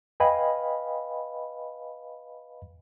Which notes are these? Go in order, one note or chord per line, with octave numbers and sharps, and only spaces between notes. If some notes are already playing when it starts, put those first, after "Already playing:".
B4 D#5 F5 G5 G#5 B5